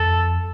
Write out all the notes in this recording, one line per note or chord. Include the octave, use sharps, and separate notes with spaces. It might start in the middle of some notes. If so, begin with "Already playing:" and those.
Already playing: F2 A4